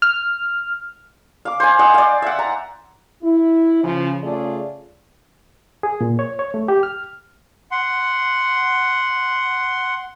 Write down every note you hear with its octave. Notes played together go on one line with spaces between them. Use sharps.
F6
F5 D6
C5 G#5
D#5 F#5
D5 F5
E5 F#5
A#5
E4
C#3 F3
C#3 A3 F4 G#4 D5
G#4
A#2
C#5
C#5
A3
G4
F6
F#5 C6